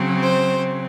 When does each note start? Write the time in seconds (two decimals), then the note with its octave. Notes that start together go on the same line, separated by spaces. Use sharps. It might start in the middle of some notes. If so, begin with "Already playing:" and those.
Already playing: C#3 F#3 C4
0.23 C5